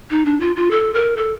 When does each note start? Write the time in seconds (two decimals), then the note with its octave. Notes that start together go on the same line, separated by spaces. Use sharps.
0.10 D#4
0.26 D4
0.40 F4
0.56 F4
0.71 A4
0.94 A#4
1.17 A4